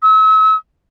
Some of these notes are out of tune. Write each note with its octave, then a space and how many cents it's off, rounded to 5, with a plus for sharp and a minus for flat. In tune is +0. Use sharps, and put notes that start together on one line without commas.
E6 -40